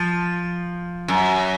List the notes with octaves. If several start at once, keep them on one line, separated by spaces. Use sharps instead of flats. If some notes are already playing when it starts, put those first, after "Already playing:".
Already playing: F3
F#2